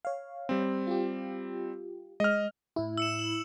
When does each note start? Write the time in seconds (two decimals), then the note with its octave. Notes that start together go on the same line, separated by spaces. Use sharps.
0.05 C#5 F5
0.49 G3 C4
0.87 F4 G4
2.20 G#3 D#5 F6
2.76 A2 E4
2.98 E6 C#7 E7
3.19 F#7